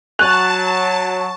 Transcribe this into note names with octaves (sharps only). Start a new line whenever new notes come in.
F#3 C#5 G#5 A5 F#6 F7